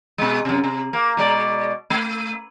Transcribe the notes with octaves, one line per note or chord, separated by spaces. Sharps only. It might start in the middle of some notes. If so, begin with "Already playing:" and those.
B2 G#3
F#2 C3
C3
A#3
B2 G#3 D5
A3